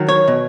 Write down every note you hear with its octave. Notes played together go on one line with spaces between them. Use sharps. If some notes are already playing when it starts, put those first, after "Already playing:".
Already playing: D#3 F#3
C#5
B2